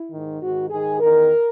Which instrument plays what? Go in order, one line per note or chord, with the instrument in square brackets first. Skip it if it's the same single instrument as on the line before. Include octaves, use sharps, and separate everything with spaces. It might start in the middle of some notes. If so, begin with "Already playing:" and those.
Already playing: [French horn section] E4
G#2 D#3
G#2 D#3 F#4
G#2 D#3 G#4
E2 D#3 A#4